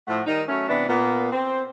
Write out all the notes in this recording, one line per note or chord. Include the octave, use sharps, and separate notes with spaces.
A2 F3 A3 F#5
D#3 G3 D#4
F#3 A3 C#4
C3 E3 B3 D4
A#2 A#3 B3
C4